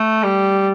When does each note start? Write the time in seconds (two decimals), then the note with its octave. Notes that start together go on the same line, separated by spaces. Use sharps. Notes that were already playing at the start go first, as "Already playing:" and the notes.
Already playing: A3
0.23 G3